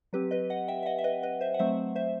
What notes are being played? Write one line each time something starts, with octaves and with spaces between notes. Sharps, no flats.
F#3 C4 G4 B4
B4 D#5
D#5 F#5
E5 G5
E5
D#5 F#5
E5
B4 D#5
B4 D#5
C5 E5
F#5
F#3 A3 C4 C5 E5
C5 E5